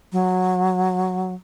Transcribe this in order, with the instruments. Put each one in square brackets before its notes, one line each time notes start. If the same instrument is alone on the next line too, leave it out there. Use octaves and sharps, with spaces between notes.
[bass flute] F#3